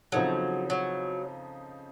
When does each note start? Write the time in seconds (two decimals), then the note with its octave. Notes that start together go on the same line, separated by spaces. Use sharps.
0.12 C#3 F3 F#3 C4 D#4 A4
0.70 F#3